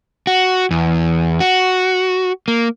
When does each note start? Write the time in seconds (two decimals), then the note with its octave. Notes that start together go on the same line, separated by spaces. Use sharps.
0.27 F#4
0.71 E2
1.40 F#4
2.48 A#3